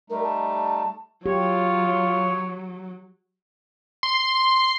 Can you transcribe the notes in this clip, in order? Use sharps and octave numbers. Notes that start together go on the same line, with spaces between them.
G3 A3 D#4 A#4
A5
F#3 F4 G4 C#5
C6